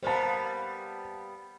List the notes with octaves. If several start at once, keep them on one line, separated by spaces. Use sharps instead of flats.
G3 A#3 B3 C5 A5